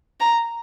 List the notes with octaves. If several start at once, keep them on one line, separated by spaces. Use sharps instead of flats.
A#5